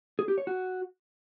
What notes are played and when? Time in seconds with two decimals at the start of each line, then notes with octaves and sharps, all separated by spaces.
0.19 G#4
0.28 G4
0.38 C#5
0.47 F#4